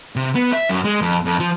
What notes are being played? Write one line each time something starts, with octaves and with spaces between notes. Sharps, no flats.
C3
B3
E5
F#2
G#3
F2
F2
F3